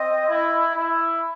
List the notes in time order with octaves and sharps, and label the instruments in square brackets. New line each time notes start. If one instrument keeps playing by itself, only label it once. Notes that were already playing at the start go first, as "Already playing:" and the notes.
Already playing: [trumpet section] C4 [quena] D#5
[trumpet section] E4
E4